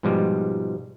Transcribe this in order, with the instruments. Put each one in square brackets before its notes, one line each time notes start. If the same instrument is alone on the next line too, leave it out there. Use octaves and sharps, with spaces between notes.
[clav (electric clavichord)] G#2 B2 F3 G3 G#3